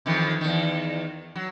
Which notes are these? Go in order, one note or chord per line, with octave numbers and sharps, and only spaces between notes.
F2 D#3 E3
E2 D#3
F#3